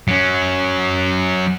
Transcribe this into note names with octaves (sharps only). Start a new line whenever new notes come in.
F#3 C#4